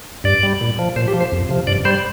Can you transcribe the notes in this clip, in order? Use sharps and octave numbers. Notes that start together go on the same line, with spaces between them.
G2 D5
G3
A#2
F3
A#2 C5
G4
F3
C5
F2
C3 F3
G2 D5
G3 C5